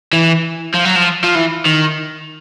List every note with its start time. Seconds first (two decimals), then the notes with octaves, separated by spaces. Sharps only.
0.13 E3
0.74 F3
0.85 F#3
0.96 F3
1.24 F3
1.35 E3
1.66 D#3